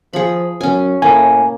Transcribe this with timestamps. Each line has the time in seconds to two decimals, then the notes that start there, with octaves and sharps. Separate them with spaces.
0.13 F3 G#4 B5
0.61 F#2 C#4 G#5
1.02 A2 A#3 G#5